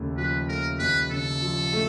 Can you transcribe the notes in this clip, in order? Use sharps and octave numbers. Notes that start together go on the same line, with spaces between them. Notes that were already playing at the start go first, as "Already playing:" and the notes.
Already playing: D#2 C#3 A3
F3 B4
A3 A#4
D#2 B4
C#3 A4
F3
A3